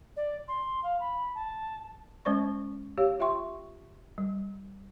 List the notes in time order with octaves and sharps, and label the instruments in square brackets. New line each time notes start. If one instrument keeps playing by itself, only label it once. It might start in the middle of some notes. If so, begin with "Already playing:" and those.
[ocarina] D5
C6
F5
B5
A5
[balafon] G#3 C#4 C5 D5 C#6
G4 C#5 F5
F4 E5 G5 C6 C#6
G3